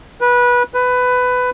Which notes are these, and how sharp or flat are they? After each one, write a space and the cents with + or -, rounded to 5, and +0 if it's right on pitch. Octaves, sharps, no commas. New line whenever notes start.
B4 -20
B4 +15